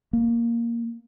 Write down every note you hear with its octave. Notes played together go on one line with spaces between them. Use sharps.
A#3